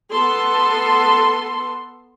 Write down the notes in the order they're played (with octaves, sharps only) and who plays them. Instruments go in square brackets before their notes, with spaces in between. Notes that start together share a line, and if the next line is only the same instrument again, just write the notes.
[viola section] B3 A4 C6